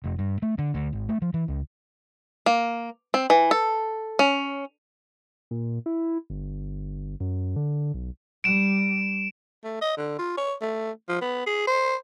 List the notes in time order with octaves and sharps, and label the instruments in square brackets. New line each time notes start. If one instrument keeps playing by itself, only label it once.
[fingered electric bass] F1
G2
A3
D3
D2
G#1
A3
F3
E3
C#2
[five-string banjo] A#3
C4
E3
A4
C#4
[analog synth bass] A#2
E4
G1
F#2
D3
B1
[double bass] G3 [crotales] D7 E7
[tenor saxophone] A3
D#5
D3
F4
C#5
A3
F3
B3
G#4
C5